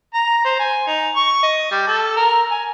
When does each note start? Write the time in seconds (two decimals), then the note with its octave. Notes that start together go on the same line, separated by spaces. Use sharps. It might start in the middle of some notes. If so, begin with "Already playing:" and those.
0.14 A#5
0.45 C5
0.59 G#5
0.87 D#4
1.16 C#6
1.43 D#5
1.71 G3
1.87 A4
2.16 A#4
2.51 G#5